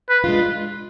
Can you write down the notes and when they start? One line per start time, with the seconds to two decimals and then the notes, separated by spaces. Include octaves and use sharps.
0.09 B4
0.24 G#3 D4 F4